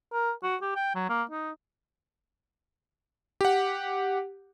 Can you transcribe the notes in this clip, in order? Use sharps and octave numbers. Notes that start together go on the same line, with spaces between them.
A#4
F#4
G4
G5
F#3
A#3
D#4
G4 F#5